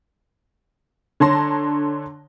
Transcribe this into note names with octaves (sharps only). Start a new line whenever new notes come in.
D3 C#5 A5 A#5 C6 A#6